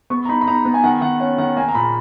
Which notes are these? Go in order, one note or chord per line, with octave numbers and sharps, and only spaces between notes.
B3 C#6
A#5
D#4 B5
B5
D#4 A#5
B3
G#5
D#3 F#5
D#3 F#5
C#4 F#5
D#3 F#5
A#3 G#5
A#5
A#2 B5